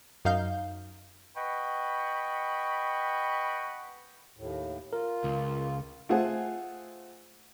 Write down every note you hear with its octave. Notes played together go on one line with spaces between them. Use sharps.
F#2 D#4 F5 G6
B4 D#5 F#5 G5 B5 C#6
D#2 A2
F4 A#4
C#2
A3 F4 G#4 C5 F#5 G#5